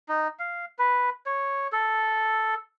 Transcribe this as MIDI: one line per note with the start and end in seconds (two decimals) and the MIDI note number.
0.09 0.28 63
0.39 0.65 77
0.79 1.10 71
1.26 1.68 73
1.72 2.55 69